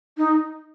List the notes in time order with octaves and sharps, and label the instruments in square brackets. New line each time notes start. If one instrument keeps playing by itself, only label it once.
[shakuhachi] D#4